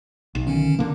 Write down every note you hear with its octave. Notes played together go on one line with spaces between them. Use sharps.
B1
D3 D#3 C#4
D3 A#3